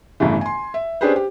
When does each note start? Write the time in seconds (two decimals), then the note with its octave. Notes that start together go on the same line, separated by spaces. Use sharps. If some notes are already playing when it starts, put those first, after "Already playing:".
0.20 G1 A2 C#3 E3
0.41 G#5 C6
0.74 E5
1.01 C#4 D4 G4 G#4 B4 C5
1.16 G4